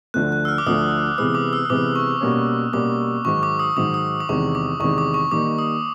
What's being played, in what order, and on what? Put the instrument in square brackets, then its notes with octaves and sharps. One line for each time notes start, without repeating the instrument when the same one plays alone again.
[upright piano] D2 D3 F3 A3 [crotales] F#6
[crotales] F#6
E6
F6
D6
[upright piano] D2 D3 F3 A3 [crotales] D#6
[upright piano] C3 E3 G#3 B3 [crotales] D#6
[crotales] D6
E6
D#6
[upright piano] C3 E3 G#3 B3 [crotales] D6
[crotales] C#6
[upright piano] B2 G3 A#3 C#4
[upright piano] B2 G3 A#3 C#4 [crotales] D6
[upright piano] G#2 D#3 F#3 [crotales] C#6
[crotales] D6
D#6
[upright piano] G#2 D#3 F#3 [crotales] D6
[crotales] D#6
D6
[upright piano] E2 C3 D#3 G#3 [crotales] C#6
[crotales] D6
[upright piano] E2 C3 D#3 G#3 [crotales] C#6
[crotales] D6
C#6
[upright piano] D#3 G3 A#3 D#4 [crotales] D6
[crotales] D#6